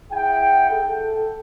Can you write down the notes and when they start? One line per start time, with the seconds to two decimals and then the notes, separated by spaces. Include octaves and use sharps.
0.12 E4 G#4 F#5 G5
0.71 A4